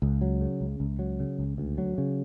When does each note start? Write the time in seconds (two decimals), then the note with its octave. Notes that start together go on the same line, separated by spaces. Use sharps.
0.02 C#2
0.21 F#3
0.41 C#3
0.61 C#2
0.80 C#2
0.99 F#3
1.20 C#3
1.38 C#2
1.58 D2
1.78 F#3
1.98 C#3